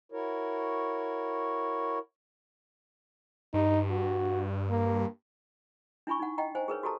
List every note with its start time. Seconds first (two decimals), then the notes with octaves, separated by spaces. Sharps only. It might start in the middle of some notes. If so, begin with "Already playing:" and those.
0.12 E4 F#4 A#4 C#5
3.54 G2 D#4
3.90 F#4
4.70 A#3
6.07 D4 E4 G#5 B5 C#6
6.19 D#4 F#5
6.38 D#5 F#5 G5 A#5
6.55 C5 F#5 G#5
6.68 G#4 A#4 B4 C#5
6.83 F#4 G4 A4 A5 A#5